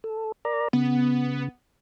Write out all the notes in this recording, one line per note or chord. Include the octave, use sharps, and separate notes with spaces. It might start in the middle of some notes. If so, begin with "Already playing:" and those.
A4
A#4 D5 A#5
C#3 B3